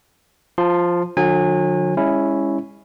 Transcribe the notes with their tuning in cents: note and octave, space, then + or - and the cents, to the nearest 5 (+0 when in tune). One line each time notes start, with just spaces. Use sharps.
F3 +0 A5 +30 C6 +0
D3 +35 F#3 -35 G#5 -25
G#3 -35 C#4 +0 E4 +0